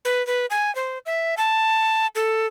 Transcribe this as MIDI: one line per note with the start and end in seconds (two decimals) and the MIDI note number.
0.05 0.25 71
0.27 0.46 71
0.50 0.73 80
0.75 0.98 72
1.06 1.35 76
1.37 2.07 81
2.15 2.47 69